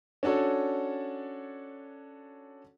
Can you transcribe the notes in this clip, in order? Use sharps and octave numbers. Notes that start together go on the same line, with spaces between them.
C#4 D4 F#4 A4 C#5